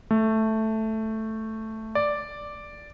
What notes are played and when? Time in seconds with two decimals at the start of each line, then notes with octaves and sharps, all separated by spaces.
0.11 A3
1.95 D5